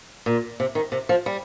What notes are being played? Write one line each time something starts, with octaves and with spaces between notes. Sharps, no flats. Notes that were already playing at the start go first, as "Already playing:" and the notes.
A#2
C3
D#3
C3
F3
G3